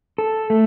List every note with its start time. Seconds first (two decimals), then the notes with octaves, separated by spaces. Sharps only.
0.18 A4
0.50 A3